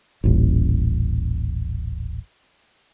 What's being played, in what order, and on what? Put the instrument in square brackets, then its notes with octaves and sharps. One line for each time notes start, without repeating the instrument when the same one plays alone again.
[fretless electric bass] D#1 A1